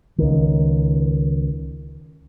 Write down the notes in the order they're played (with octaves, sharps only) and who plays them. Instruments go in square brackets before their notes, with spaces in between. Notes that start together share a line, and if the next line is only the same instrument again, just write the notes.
[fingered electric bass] C#2 D#3